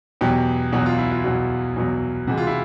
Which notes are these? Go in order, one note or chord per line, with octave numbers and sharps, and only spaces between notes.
E2 B2 F#3 G4
E2 B2 F#3 F#4
F4
E4
F4
E2 B2 F#3 F#4
E2 B2 F#3
C3 E3 G#3 F#4
F4
E4